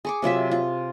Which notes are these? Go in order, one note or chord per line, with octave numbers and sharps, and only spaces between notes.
G#4 C#6 D6
C3 F#3 F4 E5
F4